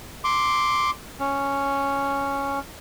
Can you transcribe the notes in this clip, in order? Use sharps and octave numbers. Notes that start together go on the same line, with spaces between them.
C6 D6
C#4